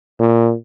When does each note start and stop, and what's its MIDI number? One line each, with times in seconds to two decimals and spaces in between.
0.20 0.54 46